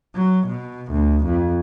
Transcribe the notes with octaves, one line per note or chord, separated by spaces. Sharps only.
F#3
B2
D2
F2